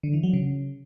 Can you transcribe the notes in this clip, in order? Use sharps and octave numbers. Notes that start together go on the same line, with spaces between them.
D3
E3
F#3
C#3